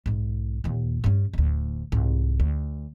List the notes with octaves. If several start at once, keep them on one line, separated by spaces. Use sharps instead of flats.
B1 G#2
D#2 A#2
G2 C#4
D1 D2
C2 G#2
D2